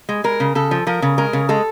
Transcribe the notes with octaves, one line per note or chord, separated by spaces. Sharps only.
G#3
G#3 A#4
C#3
C#3 A4
F3
F3 A#4
C#3
G#3 A#4
C#3
G#3 A4